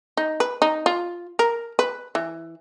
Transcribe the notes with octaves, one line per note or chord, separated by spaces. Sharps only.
D#4
B4
D#4
F4
A#4
B4
E3